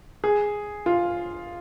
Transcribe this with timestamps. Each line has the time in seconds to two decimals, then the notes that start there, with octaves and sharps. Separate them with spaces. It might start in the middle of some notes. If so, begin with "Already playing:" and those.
0.24 G#4
0.86 F4